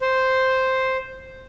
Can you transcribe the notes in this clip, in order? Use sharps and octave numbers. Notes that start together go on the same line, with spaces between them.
C5